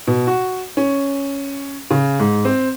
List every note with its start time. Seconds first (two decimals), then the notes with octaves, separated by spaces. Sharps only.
0.07 B2
0.27 F#4
0.77 C#4
1.91 C#3
2.20 G#2
2.45 C4